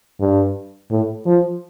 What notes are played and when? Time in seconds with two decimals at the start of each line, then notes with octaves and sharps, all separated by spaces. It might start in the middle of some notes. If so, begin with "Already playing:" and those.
0.20 G2
0.90 A2
1.26 F3